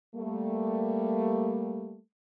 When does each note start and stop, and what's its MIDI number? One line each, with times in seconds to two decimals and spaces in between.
0.15 1.98 55
0.15 1.98 57
0.15 1.98 58